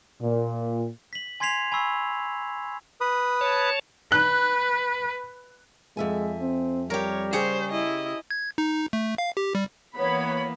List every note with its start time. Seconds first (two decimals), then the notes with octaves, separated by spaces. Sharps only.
0.21 A#2
1.13 B6 F#7
1.40 G#5 C6 G#6 B6 C7 F7
1.72 G#5 B5 C#6 E6 C7
3.01 B4 B5 D#6
3.41 C#5 A5
4.12 B4 F#6
5.97 F2 G#3 E5 G#5
6.41 C4
6.90 G3 G4 A#4 C#5
7.33 C#3 G4 G#4 C5 C#5
7.70 E4 D#5
8.31 G#6
8.58 D#4
8.93 A3
9.18 F5
9.37 G4
9.55 G3
9.96 E3 A#3 B3 C#5 B5